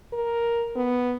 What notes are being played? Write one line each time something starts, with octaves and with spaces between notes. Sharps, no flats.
A#4
B3